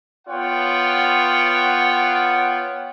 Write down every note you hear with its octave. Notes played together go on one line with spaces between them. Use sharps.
B3 F4 C#5 F#5 G5